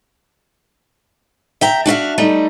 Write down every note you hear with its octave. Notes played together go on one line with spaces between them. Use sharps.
E5 G5 A#5
D4 F#4 E5 F5
G3 A3 D#4